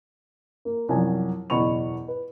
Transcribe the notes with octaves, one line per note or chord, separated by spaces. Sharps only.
A#3
C2 F#2 F3 F#3 G#5 A5
F#1 E2 B2 B5 C#6 F7
B4